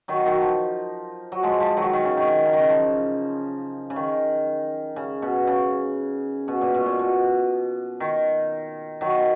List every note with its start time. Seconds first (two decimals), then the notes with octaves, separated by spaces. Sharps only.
0.08 D#3 F#3
0.26 D#3 F#3
0.42 F3
1.32 F#3
1.43 F3 G#3
1.60 F3
1.77 D#3 F#3
1.93 D#3
2.04 C#3
2.17 D#3
2.45 C#3
2.53 D#3
2.60 C#3
2.69 F3
3.90 C#3
3.96 D#3
4.96 C#3
5.22 B2
5.47 C#3
6.48 B2
6.61 A#2
6.74 B2
6.86 A#2
6.99 B2
8.00 D#3
9.01 D#3 F#3